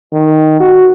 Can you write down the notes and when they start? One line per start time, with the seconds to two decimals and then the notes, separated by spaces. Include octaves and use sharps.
0.13 D#3
0.60 F#4